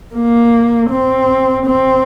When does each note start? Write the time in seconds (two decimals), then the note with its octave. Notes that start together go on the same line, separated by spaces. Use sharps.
0.15 A#3
0.90 C4
1.66 C4